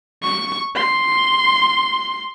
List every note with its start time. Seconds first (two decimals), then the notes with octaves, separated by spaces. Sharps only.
0.22 C#6
0.75 C6